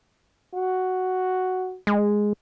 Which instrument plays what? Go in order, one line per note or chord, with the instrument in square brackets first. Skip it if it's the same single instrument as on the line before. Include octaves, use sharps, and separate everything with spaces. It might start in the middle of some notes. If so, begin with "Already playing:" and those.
[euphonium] F#4
[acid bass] G#3